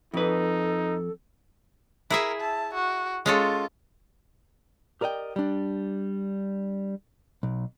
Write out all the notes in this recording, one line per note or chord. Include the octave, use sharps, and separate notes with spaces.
F2 D#4 A4 B4
E4 G#4 A#4 E5
A5
F#4
G#3 C#4 F4 A4
G4 A#4 D5 D#5 G5
G3 D4
B1